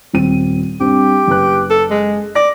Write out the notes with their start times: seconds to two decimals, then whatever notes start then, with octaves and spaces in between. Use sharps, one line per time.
0.13 D#1 C4 D#7
0.80 G2 C4 G4
1.27 F#1 B4 F#6
1.70 A4
1.90 G#3
2.35 D5 A#6